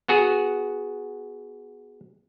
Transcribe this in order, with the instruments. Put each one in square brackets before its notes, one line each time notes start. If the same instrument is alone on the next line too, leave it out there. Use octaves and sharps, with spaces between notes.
[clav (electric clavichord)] B3 F#4 G#4